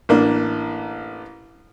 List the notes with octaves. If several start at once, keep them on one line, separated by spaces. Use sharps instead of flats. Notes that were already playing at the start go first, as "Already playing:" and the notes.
A1 A#3 D4